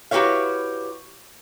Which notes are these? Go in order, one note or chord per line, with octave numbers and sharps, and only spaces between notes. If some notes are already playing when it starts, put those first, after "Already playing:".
E4 F#4 G4 B4 C#5 F5